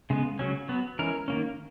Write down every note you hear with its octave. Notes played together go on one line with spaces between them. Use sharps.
C#3 G#3 B3
C#3 F#3 C#4
F#3 B3
E3 G#3 C#4 A#4
D#3 A#3 C#4